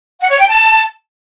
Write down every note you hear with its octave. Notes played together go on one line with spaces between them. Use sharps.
F#5
C#5
G5
A5